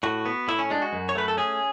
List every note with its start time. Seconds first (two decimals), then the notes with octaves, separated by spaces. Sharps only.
0.03 A2 F#4
0.26 B3
0.48 A2 E4
0.59 C#4
0.70 G#3 D4
0.82 F#4
0.93 F#2
1.09 C#5
1.15 A3 B4
1.28 A4
1.37 C#4 G#4